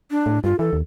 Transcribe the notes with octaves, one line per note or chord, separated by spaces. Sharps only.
D4
A2
G2 F4
E3 A4
D#2